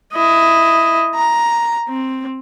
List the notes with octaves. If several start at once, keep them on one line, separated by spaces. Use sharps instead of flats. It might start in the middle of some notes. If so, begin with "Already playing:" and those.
E4 D#5
A#5
C4